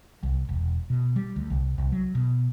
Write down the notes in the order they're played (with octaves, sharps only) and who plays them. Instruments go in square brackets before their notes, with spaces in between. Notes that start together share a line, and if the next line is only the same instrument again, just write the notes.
[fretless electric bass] C2
E1
B2
G3
D2
C2
C2
F#3
B2